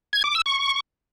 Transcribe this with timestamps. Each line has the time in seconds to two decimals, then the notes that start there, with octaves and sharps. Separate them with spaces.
0.13 G#6
0.24 D6
0.35 E6
0.46 C#6